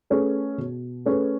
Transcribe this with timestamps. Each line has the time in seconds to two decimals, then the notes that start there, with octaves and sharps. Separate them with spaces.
0.10 A3 C#4 G#4 B4
0.58 B2
1.06 A3 C#4 G#4 B4